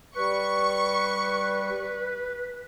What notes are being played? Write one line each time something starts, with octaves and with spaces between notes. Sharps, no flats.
G3 B4 C#6